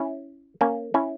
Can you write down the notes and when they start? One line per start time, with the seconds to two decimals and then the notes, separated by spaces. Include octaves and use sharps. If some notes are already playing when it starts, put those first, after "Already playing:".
Already playing: C#4 E4
0.61 A#3 C#4
0.94 C#4 E4